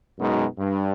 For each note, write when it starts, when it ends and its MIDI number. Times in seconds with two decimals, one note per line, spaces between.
0.19 0.45 42
0.19 0.45 47
0.19 0.45 56
0.19 0.45 63
0.59 0.93 43